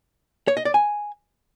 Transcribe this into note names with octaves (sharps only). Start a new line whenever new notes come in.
C#5
D#5
D5
G#5